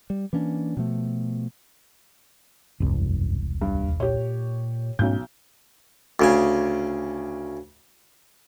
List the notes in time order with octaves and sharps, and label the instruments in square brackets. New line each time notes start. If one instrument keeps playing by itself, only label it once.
[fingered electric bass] G3
E3 A#3 C#4 D4
B2 F3 A3
[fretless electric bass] E1 C2 [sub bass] F#2
[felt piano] G2
[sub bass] D#2
[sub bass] A#2 [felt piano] G4 C#5
[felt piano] B1 G6 [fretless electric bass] G#2 A3 C#4
[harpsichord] D2 C#3 G#5